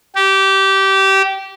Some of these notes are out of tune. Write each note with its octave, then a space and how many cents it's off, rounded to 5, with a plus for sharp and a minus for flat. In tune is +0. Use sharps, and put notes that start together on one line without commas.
G4 -20